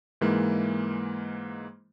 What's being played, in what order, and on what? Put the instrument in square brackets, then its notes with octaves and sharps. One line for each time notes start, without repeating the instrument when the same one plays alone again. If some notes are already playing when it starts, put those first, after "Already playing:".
[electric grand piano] G#2 E3 G#3 A#3